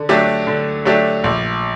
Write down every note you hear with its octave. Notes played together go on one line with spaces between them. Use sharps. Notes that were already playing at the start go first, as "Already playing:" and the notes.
Already playing: D3
F#3 A3 D4 G4
D3
F#3 A3 D4 G4
A#1